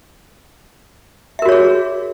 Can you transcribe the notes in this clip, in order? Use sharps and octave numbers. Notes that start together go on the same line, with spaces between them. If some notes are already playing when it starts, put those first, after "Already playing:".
F#4 G#4 A#4 C#5 E5